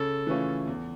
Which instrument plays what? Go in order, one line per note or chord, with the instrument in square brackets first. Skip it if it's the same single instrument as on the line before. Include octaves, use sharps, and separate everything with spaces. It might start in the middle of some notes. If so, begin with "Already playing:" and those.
Already playing: [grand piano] C#3 [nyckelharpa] A4
[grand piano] E3 A3 C#4 F4
E2